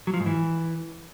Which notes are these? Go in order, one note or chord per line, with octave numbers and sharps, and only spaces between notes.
F#3
F3
G#2
E3